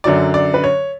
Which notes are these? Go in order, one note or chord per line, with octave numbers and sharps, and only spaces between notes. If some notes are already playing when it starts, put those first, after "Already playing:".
F#2 D3 F#3 D5
D5
B4
C#5